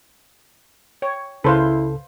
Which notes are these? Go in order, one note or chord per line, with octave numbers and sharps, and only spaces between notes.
C#5 G5
C#2 C#3 E4 A4 B4 C5 F5